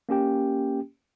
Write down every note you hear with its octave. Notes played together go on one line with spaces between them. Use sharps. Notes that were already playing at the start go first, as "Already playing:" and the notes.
A#3 C#4 G4 G5